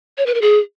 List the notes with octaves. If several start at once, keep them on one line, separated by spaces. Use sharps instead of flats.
C#5
B4
A#4
G#4